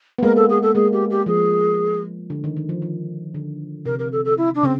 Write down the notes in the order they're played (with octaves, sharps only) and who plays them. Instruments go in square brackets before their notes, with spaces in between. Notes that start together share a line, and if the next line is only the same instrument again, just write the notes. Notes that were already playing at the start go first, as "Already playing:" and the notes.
[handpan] B3
[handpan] G#3 A#3 [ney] A#4
[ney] A4
G#4
A4
[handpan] G#3 A#3 [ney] G#4
[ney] G4
G4
[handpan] F3 [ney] G#4
[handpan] D3
D#3
D#3
F3
D#3
D3
[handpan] C3 [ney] A#4
[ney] A#4
A4
A4
E4
D4
[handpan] C#3 [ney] C4